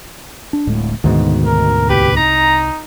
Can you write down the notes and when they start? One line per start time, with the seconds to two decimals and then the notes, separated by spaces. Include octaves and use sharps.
0.53 D4
0.67 D1 A2 G#3
1.04 D2 G#2 B2 D#3
1.46 A#4
1.90 C2 G4 B4
2.17 D#4 A#5